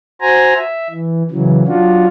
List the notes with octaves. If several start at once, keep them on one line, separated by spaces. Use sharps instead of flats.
F#4 C5 G#5 A#5
E5
E3
C#3 E3 F#3
F#3 D4 F4 F#4